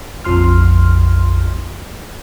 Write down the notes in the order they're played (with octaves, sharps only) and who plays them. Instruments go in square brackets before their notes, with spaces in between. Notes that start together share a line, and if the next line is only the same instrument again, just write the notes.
[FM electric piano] A#1 F2 F3 C6 F6